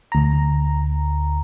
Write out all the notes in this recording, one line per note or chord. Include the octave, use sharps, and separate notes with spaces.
D2 A#5